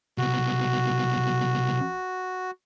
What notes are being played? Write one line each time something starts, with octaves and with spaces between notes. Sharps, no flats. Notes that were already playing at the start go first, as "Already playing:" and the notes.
C2 B2 F#4